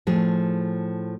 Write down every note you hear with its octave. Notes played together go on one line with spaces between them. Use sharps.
A2 F3 G#4